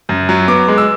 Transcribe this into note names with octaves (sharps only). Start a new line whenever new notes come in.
F#2
F#3
B3 D6
G#3
E6